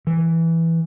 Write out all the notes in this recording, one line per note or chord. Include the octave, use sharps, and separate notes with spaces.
E3